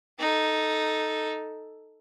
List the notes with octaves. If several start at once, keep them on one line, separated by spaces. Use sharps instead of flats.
D#4 A4